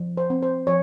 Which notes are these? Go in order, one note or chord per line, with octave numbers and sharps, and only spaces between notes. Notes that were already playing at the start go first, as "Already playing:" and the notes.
Already playing: F3
C5
C4
C5
F3 C#5